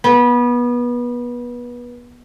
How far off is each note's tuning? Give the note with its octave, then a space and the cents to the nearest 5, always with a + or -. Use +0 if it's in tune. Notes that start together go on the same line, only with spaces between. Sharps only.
B3 -25